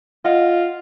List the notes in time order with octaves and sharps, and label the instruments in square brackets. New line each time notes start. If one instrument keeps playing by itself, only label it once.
[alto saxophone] F4 [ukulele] D#5 F#5